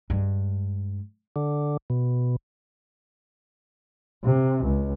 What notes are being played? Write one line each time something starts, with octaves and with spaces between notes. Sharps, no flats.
G2 G#3
D3
B2
C3
C#2